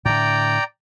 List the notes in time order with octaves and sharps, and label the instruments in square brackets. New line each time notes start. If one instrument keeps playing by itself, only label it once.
[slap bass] A2 D3 [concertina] D5 G5 A#5